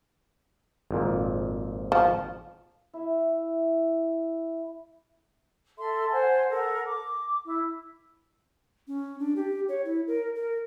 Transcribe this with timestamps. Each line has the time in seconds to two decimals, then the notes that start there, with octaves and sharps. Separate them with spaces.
0.91 G#1 F2 A#2
1.92 F3
2.94 E4 E5
5.77 A4 E5 C6
6.11 C5 F#5 G#5
6.49 A4 A#4 F#5
6.83 D6
7.44 E4
8.88 C#4
9.19 D4
9.36 G4
9.69 C#5
9.85 E4
10.07 A#4
10.35 A#4